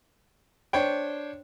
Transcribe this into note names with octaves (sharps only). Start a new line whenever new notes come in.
D4 C5 C#5 G5